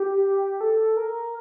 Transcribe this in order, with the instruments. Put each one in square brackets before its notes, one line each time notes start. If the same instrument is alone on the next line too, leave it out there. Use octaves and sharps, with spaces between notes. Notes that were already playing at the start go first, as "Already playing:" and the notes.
Already playing: [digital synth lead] G4
A4
A#4